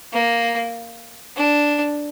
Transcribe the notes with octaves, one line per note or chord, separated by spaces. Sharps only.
A#3
D4